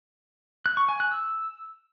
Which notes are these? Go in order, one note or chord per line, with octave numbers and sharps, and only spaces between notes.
F#6
C#6
G#5
F#6
E6